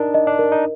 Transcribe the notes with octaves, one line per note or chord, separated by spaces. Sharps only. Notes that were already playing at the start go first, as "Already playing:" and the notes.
Already playing: D4 D#4 A#4
D#5
D4
A#4
D#4